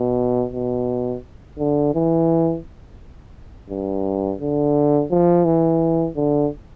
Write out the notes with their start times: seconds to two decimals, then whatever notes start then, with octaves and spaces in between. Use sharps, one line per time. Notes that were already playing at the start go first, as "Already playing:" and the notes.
Already playing: B2
0.53 B2
1.58 D3
1.94 E3
3.70 G2
4.40 D3
5.11 F3
5.45 E3
6.16 D3